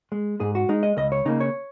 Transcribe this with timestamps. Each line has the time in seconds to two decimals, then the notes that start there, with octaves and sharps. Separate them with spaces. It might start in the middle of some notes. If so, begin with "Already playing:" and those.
0.12 G#3
0.40 G#2 G#4
0.55 F#4
0.69 G#3 D#4
0.83 D#5
0.97 C#2 D#5
1.12 C#5
1.25 C#3 A#3 D#4
1.40 C#5